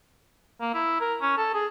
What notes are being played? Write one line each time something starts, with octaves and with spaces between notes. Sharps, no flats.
A#3
E4
A#4
C#4
A4
G#4